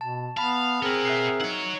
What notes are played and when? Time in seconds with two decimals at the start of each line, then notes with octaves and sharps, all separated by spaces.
0.01 B2 A5
0.37 B3 F5 A5 B5
0.82 B3 C4 F#4 G#4 A#4
1.05 E5 F#6 C7
1.41 D#4 C#5 F#5